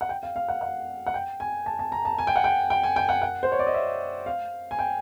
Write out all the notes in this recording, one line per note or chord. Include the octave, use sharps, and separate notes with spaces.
F#5
G5
F5
F5
F#5
F#5
F#5
G5
G#5
A5
A5
A#5
A5
G#5
G5
F#5
G5
G5
G#5
G5
F#5
F#5
C5
C#5
D5
D#5
E5
F5
G#5
G5